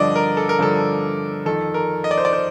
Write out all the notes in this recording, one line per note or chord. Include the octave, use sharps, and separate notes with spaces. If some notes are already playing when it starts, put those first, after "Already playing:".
Already playing: G2 D3 F3 D5 D#5
A#4
A4
A#4
G2 D3 F3 A4
F2 D#3 A4
A#4
D#5
D5
C5
D5
C5